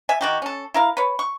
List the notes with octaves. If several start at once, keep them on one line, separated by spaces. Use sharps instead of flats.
E5 G#5
D#3 F#4 G4
C#4 A4
E4 A#4 F5
B4 C#5
C#6